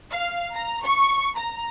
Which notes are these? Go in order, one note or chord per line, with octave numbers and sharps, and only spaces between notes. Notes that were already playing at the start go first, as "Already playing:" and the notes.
F5
A#5
C#6
A#5